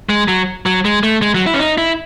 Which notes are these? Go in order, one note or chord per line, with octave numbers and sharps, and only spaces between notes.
G#3
F#3
F#3
G#3
A3
G#3
F#3
E4
C#4
D#4
E4